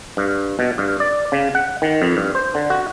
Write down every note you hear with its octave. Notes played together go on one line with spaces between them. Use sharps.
G2
B2
G2
D5
C#3
F#5
D#3
F2
G2
C5
D3
F#4